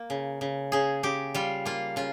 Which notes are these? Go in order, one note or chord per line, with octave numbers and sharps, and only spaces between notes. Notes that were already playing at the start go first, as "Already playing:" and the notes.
Already playing: A#3
C#3
C#3
C#3 G#4
C#3 G4
G3 F4
A#3 F4
C#3 F4